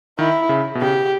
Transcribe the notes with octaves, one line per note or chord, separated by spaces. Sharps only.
D#3 E4
C#3
B2
C#3 G4